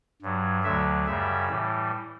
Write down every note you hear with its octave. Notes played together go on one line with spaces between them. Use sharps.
G2 F#3
D2 D3 F#3 E5
F#2 C#3 G3 E5
A2 E3 G3